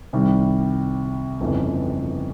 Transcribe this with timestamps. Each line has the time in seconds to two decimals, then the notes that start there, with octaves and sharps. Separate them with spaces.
0.13 C2 C3 D#3 G3
1.40 G1 F2 C#3 E3